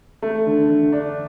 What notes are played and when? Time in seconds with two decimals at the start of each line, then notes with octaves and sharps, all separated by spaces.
0.22 A3
0.46 D3
0.69 D3
0.92 D4